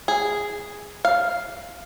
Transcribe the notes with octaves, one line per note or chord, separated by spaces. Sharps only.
G#4
F5